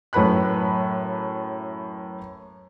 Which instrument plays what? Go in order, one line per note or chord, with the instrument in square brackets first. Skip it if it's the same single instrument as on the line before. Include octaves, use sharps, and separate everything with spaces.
[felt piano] F#2 A2 B4 B5 F#6